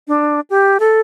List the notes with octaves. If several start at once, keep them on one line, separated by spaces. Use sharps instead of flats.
D4
G4
A4